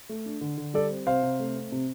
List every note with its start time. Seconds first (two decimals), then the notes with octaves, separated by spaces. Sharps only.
0.09 A3
0.26 D4
0.41 D3
0.58 D3
0.74 G3 A4 D5
0.91 C4
1.07 C3 C5 F5
1.23 C3
1.40 A3
1.56 C4
1.72 C3